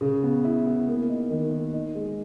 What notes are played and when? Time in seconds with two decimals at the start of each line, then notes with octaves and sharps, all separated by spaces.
0.01 C#3
0.23 B3
0.44 E4
0.66 B3
0.88 A#3
1.09 D#4
1.30 D#3
1.52 A#3
1.74 D#4
1.95 G#3